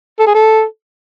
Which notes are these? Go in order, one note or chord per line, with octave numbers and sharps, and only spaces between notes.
A4
G#4
A4